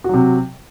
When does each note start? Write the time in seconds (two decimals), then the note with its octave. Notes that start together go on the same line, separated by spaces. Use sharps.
0.04 F#4
0.09 F#3
0.14 C3